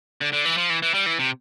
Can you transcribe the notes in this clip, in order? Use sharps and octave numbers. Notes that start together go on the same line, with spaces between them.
D3
D3
E3
F3
E3
E3
G3
E3
C3